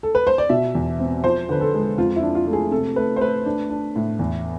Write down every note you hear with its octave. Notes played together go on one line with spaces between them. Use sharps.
A4
B4
C5
D5
B2 E5
E2
C4
F3 C5
D3 B4
A4
G#3
F2 F4
E4
D4
F4
A3
G#4
C3 A4
A3 B4
C5
A3 B4
D4
D4
A2
E2